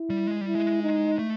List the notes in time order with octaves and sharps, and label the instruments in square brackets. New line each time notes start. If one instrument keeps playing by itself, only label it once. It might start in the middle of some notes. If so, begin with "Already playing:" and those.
Already playing: [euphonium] E4
[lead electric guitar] G3
G#3
G3
[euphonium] E4
[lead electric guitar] G#3
[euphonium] D#4
[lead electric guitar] A3